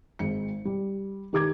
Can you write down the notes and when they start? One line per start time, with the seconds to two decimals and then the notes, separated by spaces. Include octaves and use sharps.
0.19 G#1 G#3 C#7
0.65 G3
1.33 D#3 G4 D6 G#6